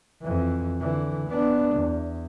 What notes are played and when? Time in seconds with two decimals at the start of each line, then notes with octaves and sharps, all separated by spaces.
0.22 F2 E3
0.80 D3 E3
1.28 B3 D4
1.76 E2